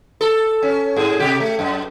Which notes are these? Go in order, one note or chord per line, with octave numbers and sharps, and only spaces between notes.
A4
C#4
G#2 G#4
C3 G4
A3
F#2